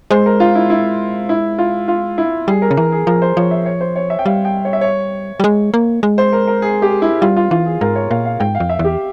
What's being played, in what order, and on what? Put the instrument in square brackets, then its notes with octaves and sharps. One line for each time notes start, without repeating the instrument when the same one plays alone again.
[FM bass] G#3 [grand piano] C5
[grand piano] A#4
F4
E4
E4
E4
F4
F4
E4
[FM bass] G3 [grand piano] G#4
[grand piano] A#4
[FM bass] C#3
[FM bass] E3 [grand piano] A#4
[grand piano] G#4
[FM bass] F3 [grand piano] A#4
[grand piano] C5
[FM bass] F3 [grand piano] C#5
[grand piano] E5
C#5
C5
C#5
E5
G5
[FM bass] G3 [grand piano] F5
[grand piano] G5
C#5
E5
C#5
[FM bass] G3
G#3
A#3
G#3
[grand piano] C5
A#4
A#4
G#4
G4
E4
[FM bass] G3 [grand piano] F4
[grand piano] F4
[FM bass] E3 [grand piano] F4
[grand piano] G#4
[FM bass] G#2 [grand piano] A#4
[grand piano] C#5
[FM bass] A#2 [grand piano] F5
[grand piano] F5
[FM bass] G#2 [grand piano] G5
[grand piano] F5
[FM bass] F2
[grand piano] E5
[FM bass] E2
[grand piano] G4